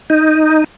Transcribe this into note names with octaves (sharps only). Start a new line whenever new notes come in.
D#4